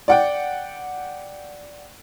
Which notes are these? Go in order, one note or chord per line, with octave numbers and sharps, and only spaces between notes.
D5 F#5 G5